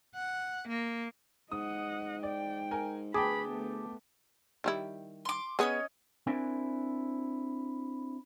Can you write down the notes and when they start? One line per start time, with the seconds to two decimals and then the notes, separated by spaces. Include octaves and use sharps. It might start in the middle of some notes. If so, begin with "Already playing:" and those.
0.15 F#5
0.69 A#3
1.52 G#2 D#5 F#5 D#6
2.23 D5 G5
2.71 A#4 G#5
3.14 D2 G#4 B4 G5 A5 B5 D6
3.48 A3 B3
4.64 D#3 G3 E4
5.25 C6 D6
5.59 B3 C#4 G#4 C#5 D#5
6.27 C4 D4 E4 A#4 C5 G#5